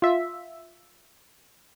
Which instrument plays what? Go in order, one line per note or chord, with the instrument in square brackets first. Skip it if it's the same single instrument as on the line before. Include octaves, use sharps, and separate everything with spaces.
[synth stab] F4 E5